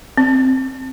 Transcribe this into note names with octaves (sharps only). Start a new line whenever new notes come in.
C4